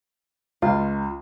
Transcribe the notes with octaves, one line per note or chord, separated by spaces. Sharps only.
C#2 F4